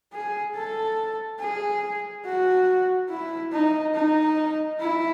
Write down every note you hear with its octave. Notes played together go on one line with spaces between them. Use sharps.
G#4
A4
G#4
F#4
E4
D#4
D#4
E4